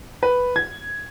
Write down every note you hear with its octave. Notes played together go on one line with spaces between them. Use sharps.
B4
G#6